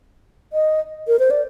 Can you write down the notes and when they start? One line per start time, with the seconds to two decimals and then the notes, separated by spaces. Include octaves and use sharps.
0.53 D#5
1.08 A#4
1.19 C5
1.31 D5